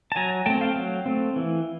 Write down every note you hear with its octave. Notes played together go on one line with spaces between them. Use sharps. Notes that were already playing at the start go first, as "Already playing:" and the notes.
A5
F#3 G#5 A#5
A3 C4 G5 A5
F5 G5
F#3
A3 C4
E3